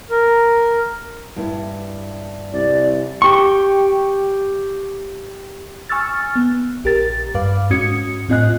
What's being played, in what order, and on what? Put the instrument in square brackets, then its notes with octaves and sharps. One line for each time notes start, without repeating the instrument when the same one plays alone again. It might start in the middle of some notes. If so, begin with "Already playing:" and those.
[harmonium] A#4
[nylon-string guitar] G2 E4
[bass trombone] C2 [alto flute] D5
[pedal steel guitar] G4 C#6
[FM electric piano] G#5 C#6 E6 F6 A6
B3
A#1 G4 A#4 A6
G2 B4 F5 D6
G#2 C#4 F#4 D#6 G#6 C#7
A2 C4 F4 D#5 G#5 F#6